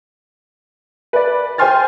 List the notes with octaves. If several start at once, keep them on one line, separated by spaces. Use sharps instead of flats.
B4 D5
C5 G5 G#5 C6 F6 A6